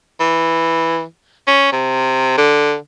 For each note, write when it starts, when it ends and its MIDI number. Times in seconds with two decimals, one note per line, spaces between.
0.20 1.03 52
1.47 1.71 61
1.73 2.36 48
2.37 2.75 50